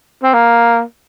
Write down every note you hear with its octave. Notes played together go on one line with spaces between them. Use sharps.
C4
A#3